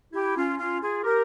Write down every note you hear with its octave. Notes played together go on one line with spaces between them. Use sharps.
E4 G4
C#4 F4
C#4 F4
F4 G#4
G4 A#4